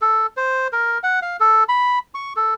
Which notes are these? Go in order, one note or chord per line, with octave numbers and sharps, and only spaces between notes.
A4
C5
A#4
F#5
F5
A4
B5
C#6
A4